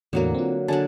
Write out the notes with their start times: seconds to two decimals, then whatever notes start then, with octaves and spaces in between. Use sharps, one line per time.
0.13 E2 A2 D3 F#3 A#3
0.34 C4 F4
0.68 D3 F#3 D4 G#5 A5